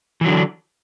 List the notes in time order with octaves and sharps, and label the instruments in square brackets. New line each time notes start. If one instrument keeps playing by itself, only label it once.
[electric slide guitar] E3
F#3
D3
D4